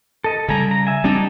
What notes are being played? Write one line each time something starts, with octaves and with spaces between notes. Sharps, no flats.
A4 D#5
C#3 G3 A4 G#5 A#5
A#5
E5 G#5
G3 C4 D4 D#4 G4 A5